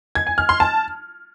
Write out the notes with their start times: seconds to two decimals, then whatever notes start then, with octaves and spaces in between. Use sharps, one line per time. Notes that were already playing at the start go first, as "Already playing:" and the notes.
0.15 G#6
0.27 G#5
0.38 F6
0.49 C6
0.60 A5